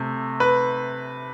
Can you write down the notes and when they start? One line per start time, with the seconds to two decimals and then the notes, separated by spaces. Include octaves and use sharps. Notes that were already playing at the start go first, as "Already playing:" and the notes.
Already playing: C3 A3
0.40 B4